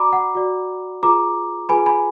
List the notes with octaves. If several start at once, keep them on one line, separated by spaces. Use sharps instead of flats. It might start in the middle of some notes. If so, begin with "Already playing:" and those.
Already playing: F#4 D5 A#5 B5 D6
F#5
F#4 D5
F4 G#4 B4 A#5 D6
F4 G#4 B4 G#5 B5
G#5 B5